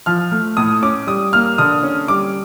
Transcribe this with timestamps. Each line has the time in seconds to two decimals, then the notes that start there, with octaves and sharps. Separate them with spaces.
0.06 F3 F6
0.32 A3
0.57 A2 D#6
0.82 C#4 D6
1.07 G3 D#6
1.33 A#3 F6
1.58 D3 D#6
1.83 C#4
2.08 G3 D6